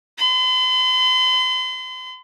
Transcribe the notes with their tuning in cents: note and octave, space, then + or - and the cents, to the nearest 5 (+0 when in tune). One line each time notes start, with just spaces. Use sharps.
C6 -45